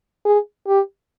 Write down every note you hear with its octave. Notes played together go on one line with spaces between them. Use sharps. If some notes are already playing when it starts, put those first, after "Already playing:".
G#4
G4